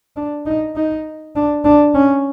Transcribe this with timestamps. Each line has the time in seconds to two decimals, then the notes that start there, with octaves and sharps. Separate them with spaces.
0.17 D4
0.46 D#4
0.76 D#4
1.36 D4
1.65 D4
1.95 C#4